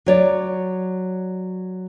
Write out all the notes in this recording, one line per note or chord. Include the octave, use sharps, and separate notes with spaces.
F#3 C#5 D5